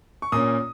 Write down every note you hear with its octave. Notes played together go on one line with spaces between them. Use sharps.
C#6
A#2 A#3 C#4 D#6